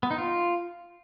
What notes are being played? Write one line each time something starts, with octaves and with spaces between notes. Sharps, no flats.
B3
D#4
F4